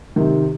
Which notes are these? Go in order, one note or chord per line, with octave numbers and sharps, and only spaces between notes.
C3 D#3